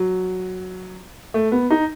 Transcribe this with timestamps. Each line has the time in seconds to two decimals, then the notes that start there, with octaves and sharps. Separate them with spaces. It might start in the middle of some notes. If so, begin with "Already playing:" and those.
Already playing: F#3
1.34 A3
1.52 B3
1.70 D#4